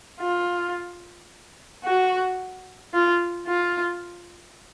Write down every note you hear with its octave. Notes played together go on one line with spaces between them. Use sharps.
F4
F#4
F4
F4